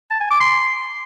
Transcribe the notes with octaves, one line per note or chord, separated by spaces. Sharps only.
A5
G#5
D6
C6